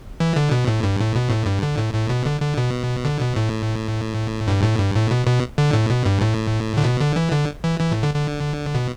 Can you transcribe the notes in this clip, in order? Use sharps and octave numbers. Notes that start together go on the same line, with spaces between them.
E3
D3
B2
A2
G2
A2
B2
A2
G2
D3
A2
A2
B2
D3
D3
B2
D3
B2
A2
G2
A2
G2
A2
B2
B2
D3
A2
B2
G2
A2
D3
B2
D3
E3
D3
E3
E3
A2
D3
D3
B2